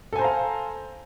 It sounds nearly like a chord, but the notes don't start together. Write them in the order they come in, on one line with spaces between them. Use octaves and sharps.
A4 G#5 C5 A#5 F5